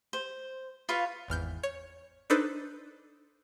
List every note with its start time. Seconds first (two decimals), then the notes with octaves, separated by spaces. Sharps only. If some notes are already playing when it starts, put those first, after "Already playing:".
0.13 C5
0.89 F4 B4 C#5 F5
1.28 G#1 E2 F6 G6
1.63 C#5
2.30 D4 D#4 A4 B4 C5